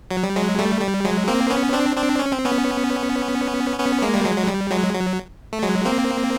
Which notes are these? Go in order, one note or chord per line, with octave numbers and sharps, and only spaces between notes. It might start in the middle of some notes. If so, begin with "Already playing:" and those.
F#3
G3
F#3 G#3
G3 A3
G3
F#3 G#3
A#3 C4
B3 C#4
C4 D4
C4 D4
C#4
C4
B3 C#4
B3 C#4
G#3 A#3
G3
F#3 G#3
F#3
G3
F#3 G#3
F#3
A3
F#3 G#3
A#3 C4